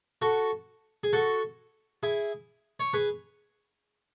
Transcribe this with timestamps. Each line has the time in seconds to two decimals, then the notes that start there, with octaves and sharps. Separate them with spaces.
0.22 F#4 A4
1.04 G#4
1.13 F#4 A4
2.03 E4 G#4
2.80 C#5
2.94 G#4 B4